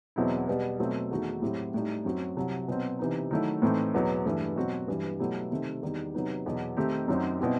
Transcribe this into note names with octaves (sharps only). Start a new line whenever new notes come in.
E2 B2 F#3 C4 E4
B2 G3 B3
B2 F#3 A3 C4 F#4
E2 D#3 A3 D#4 F#4
A2 F#3 C4 E4 G4
A2 G3 D#4
F#2 F#3 C4 F#4
C2 C3 F#3
B2 F#3 C4
C3 E3 B3 D#4
D#3 F#3 A3 E4
A2 E3 A3 C4 D#4
E2 B2 F#3 B3
G2 E3 A3
B2 F#3 C4 F#4
G2 E3 G3
B2 F#3 A3 E4 G4
C3 D#3 A3 C4
E2 D#3 G3
C3 F#3 B3 D#4
E2 B2 F#3
D#3 A3 C4 D#4 G4
F#2 F#3 C4 D#4 F#4
B2 G3 C4 E4 G4